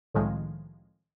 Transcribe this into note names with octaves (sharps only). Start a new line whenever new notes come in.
C2 A2 D#3 F3 G#3